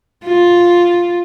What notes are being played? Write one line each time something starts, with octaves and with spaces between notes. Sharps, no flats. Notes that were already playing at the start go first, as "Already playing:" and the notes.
F4